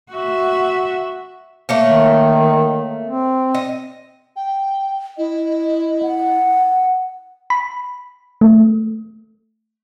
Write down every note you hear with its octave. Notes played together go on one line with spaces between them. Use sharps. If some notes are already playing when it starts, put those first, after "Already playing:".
F#4 E5
A3 A#3 C#5
D#3
C4
D#5
G5
E4 D#5
F#5
B5
A3